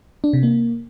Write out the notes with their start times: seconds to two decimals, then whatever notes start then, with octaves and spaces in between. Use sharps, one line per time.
0.24 D4
0.33 C3
0.43 A#3